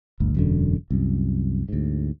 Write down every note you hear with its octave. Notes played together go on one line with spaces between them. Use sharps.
G1 D2
E1 F#2 D3
C2 F#2
D2 G#2